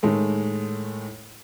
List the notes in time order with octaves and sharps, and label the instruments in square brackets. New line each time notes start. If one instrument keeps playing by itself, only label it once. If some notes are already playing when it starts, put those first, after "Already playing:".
[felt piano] A2 D#3 G#3 A3